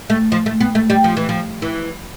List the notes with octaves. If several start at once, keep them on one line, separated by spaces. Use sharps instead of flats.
A3
F3
A3
B3
A3
G3
F3
E3
F3
E3